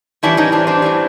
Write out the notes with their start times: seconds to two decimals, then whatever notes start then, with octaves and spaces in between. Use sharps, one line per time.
0.23 A2 E3 G3 D4 E4
0.37 C#4 D#4
0.52 C4 D4
0.67 C4 D4
0.82 A2 E3 G3